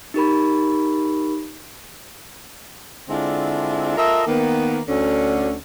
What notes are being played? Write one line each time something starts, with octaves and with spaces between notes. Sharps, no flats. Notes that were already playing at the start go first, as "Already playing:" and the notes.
D#4 G4 A#4 B5
D3 G#3 C4 D4 E4 F4
F4 A4 A#4 D#5 E5
D#3 A#3 B3
D2 D3 C#4